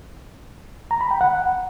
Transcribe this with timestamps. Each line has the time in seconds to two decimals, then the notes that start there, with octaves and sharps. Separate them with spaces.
0.91 A#5
1.01 B5
1.11 G5
1.21 F#5